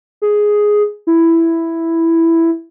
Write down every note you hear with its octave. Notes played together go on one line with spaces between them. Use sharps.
G#4
E4